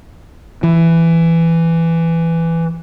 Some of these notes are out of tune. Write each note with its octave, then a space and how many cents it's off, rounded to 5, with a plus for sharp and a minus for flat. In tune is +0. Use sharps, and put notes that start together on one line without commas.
E3 +10